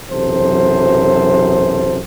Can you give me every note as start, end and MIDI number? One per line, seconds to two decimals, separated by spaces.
0.11 1.99 35
0.11 1.99 42
0.11 1.99 48
0.11 1.99 52
0.11 1.99 69
0.11 1.99 72